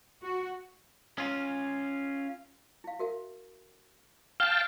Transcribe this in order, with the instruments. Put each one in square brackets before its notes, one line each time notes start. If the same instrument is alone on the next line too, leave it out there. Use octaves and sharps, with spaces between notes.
[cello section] F#4
[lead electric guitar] C#4 F4
[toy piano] E4 F5
F#4 A#4 E5
[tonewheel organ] F5 G5 A5 [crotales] F6